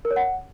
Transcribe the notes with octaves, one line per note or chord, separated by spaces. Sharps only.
A#4
C#5
F#5